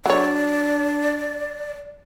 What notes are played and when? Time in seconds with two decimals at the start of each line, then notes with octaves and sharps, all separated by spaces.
0.06 F#3 D4 C#5 D5